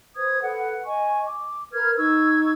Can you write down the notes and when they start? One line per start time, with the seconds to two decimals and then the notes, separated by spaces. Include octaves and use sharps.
0.16 B4 C5 D#6 G#6
0.41 A4 B4 F#5
0.85 D#5 G#5 C#6
1.26 D6
1.72 A#4 B4 F6 G#6
1.97 D#4 C#6 E6 G#6